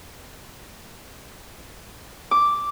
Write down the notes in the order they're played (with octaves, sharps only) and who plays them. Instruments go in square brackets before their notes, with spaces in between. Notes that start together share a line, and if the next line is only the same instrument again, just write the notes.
[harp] D6